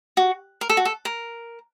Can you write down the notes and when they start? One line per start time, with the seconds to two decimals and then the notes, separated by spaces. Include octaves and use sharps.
0.17 F#4
0.61 A#4
0.69 A4
0.77 F#4
0.85 A4
1.05 A#4